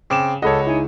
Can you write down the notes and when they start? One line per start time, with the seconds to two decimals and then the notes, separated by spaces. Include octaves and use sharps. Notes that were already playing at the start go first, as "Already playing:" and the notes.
0.10 C#3 C4 D6 E7
0.43 C#2 A4 C#5 D#5 F#5 B5
0.67 D#4 E4 G#5